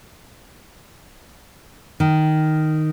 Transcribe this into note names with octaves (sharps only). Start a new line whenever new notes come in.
D#3